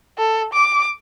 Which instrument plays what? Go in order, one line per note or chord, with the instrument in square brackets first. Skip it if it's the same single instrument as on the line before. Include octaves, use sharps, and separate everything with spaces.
[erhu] A4
D6